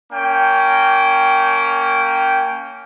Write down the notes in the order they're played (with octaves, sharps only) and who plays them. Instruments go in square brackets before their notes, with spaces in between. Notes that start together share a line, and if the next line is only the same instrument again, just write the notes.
[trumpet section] A#3 C#4 G5